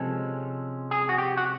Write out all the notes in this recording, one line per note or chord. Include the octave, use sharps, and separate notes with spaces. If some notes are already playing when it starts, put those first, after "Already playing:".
Already playing: C3 F3 G#3 C#4 A4
G#4
F#4
G4
F#4